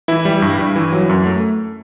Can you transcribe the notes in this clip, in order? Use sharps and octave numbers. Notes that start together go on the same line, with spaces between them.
E3 E4
G3
G2
G2
E3
F#3
F#2
A3